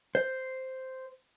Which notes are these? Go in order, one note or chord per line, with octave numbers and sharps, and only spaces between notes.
C5